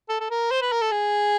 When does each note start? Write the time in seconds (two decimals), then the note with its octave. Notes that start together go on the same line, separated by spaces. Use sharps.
0.09 A4
0.20 A4
0.30 A#4
0.51 C5
0.61 B4
0.72 A#4
0.82 A4
0.91 G#4